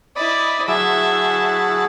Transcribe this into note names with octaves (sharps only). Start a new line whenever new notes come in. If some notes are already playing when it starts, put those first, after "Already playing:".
E4 D5 D#5 B5
F#3 E4 G#4 E5 A5